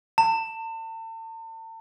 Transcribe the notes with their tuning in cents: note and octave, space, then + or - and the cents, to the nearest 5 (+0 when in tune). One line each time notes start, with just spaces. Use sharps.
A5 +40